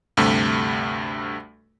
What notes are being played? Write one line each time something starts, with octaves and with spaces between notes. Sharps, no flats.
D2 G2 C3 A3